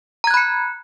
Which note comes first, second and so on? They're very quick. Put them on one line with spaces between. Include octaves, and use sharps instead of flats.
A#5 G#6 F#6 B5 C#7